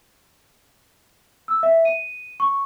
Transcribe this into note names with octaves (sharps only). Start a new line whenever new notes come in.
E6
E5
D#7
C#6